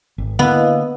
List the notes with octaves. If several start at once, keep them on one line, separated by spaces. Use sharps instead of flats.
G#1
D3 A#3 B3 E4 D#5 F5